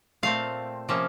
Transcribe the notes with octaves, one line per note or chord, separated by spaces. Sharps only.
A#2 A3 C4 F5
C3 F3 A#3 C#4